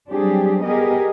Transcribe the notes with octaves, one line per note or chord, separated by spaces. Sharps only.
F#3 G3 C4 D4 G4 G#4
G3 B3 G4 G#4 A#4 D#5